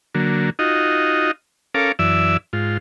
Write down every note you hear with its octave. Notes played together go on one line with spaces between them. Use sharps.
D3 F#3 A#3
D#4 F4 F#4 D#5
C#4 A4 A#4 F5 D6
F#2 E3 D5 E5 E6
G#2 F4